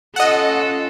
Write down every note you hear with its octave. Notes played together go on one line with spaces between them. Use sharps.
C#4 F4 A4 D#5 F#5